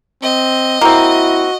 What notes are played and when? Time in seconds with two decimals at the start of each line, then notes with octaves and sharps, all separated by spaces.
0.23 C4 D#5
0.81 A#3 C4 E4 F#4